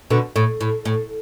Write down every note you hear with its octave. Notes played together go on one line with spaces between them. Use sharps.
B2 D3
A2
A2
A2